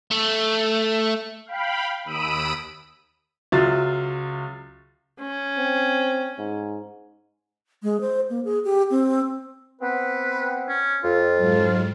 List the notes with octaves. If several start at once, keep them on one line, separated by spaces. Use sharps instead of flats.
A3
F5 G5 B5
D#2 B5 D#6 E6 D7 D#7
C#2 F#3 F4 F#4 E5 A6
C#4
C4
G#2
G#3
C5
A#3
G#4
G4
C4
B3 C4 B4
C#4
F2 F4
G#2 F#3